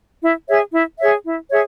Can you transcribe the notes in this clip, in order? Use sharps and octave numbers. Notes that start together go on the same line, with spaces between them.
E4
G#4 C#5 E5
E4
G#4 C#5 E5
E4
G#4 C#5 E5